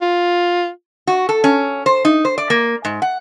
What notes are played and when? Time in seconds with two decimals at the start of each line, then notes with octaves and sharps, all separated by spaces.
0.02 F4
1.07 F#4
1.29 A4
1.44 C#4
1.86 C5
2.05 D#4
2.25 C5
2.38 D5
2.50 A#3
2.85 G#2
3.02 F#5